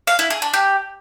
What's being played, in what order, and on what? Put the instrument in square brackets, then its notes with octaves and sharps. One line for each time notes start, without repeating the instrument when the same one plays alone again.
[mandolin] F5
E4
G#4
D4
G4